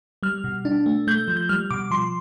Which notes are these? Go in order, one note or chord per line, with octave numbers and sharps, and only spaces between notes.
G3 F6
B2
D4
A3
A3 G6
F3
G6
G3 F6
B2 D6
F3 C6